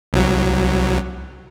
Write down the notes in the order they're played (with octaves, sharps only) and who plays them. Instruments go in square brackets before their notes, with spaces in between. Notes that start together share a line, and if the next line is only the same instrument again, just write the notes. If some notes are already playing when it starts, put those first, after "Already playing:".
[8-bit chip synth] C2 F#3